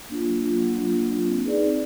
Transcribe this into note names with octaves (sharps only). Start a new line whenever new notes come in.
A#3 D4 F4
F#3
A#3 D4 F4
F#3
A#3 D4 F4
F#3
A#3 D4 F4
C4
D#4 G#4 B4 D5
C4